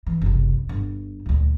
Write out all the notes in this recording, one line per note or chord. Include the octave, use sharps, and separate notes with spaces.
E3
F#1 C2
G1
D2 A#2